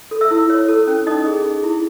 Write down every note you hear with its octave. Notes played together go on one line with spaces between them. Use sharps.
A4
E5 E6
E4
C#5
A4
C#4
D#4 D#5 D#6
G#4
G#4
E4